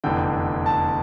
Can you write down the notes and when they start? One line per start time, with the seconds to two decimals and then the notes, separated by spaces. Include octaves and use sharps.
0.04 F1 E2 D3 G5
0.66 A5